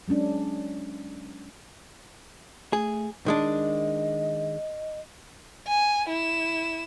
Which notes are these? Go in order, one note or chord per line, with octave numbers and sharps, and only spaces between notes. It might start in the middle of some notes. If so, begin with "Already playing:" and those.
F#3 G#3 C#4 D4
A3 G#4
D#3 G#3 D4 D#5
G#5
E4 E7